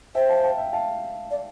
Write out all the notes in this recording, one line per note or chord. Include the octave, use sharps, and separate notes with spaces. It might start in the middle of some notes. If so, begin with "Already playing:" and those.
C5 E5 G5
F5 A5
G5
F5 A5
E5 G5
F5 A5
D5